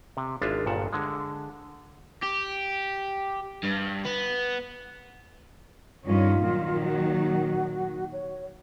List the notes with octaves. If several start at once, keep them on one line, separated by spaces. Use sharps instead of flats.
C3
G#1 G#3 D4 F4 E5 F5
G1 G2 A#2 F#5 A5
D3 G#3
G4
G2
B3
G2 D#3 C#4 F4
A#2 D#3 F#3
F#4
C#5